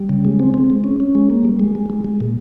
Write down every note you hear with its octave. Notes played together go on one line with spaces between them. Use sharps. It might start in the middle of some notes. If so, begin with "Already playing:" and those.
Already playing: G3
C#3
G#3
C4
C4
G#3
C#4
C#4
G#3
A#3
G3
G#3
G#3
G#3
G#3
A#2